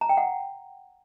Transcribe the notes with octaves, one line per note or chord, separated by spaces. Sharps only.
A#5
G5
F#5